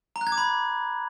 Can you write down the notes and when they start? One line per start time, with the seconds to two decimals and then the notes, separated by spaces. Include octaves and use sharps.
0.16 A#5
0.21 F#6
0.27 G#6
0.32 D6
0.38 B5